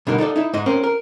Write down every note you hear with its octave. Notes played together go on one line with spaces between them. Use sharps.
B2 D3 G3 D#4 A#4
D#4 A4 A#4 D5
D#4 E4
G#2 D#5
C4 C#4 A#4
A#4